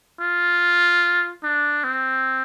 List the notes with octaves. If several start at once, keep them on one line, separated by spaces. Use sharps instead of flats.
F4
D4
C4